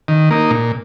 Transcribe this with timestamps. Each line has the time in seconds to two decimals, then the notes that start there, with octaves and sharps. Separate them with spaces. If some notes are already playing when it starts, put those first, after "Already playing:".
0.08 D#3
0.31 A#3 D#4
0.51 A#2